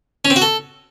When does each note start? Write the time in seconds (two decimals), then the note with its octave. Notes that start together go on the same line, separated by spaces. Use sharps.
0.25 C#4
0.30 C4
0.36 F#4
0.42 A4